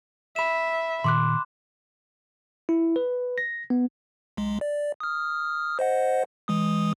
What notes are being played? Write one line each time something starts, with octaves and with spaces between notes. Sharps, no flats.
E5 B5 E7
A#2 D#3 C6 D6 F#6
E4
B4
A#6
B3
B1 G#3
D5
D#6 F6
C5 D#5 F#5
E3 G#3 D#6